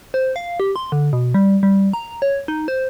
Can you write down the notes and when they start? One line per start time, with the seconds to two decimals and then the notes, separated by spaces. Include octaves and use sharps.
0.14 C5
0.36 F5
0.60 G4
0.76 C6
0.92 D3
1.13 B2
1.34 G3
1.63 G3
1.93 A#5
2.22 C#5
2.48 D#4
2.68 C5